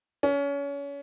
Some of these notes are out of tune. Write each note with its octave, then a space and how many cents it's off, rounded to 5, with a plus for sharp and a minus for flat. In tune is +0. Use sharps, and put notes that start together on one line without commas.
C#4 +30